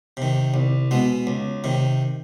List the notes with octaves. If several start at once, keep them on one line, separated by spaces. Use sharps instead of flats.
C3 D#3
C2
B2 G#3
C#2
C3 D#3